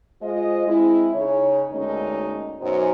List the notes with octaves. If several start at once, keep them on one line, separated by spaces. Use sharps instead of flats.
G#3 F4 C5 D#5
G#3 C4 E4
C#3 D#4 C#5
D2 G#3 A#3 C#4 D#4
F#2 B2 F#3 D#4 C5